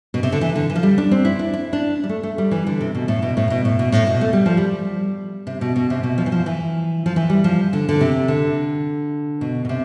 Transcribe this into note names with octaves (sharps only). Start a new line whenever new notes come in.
B2
C3
D3
E3
D3
E3
F3
G3
D4
C4
E4
D4
E4
D4
G3
A3
A3
G3
E3
D3
C3
B2
A2
B2
A2
B2
A2
B2
A2
B2
A3
G3
F3
G3
C3
B2
B2
C3
B2
F3
E3
F3
E3
F3
E3
G3
F3
D3
D3
C3
D3
B2
B2
C3